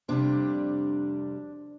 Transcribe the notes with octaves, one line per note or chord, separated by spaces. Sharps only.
F2 C3 G3 D4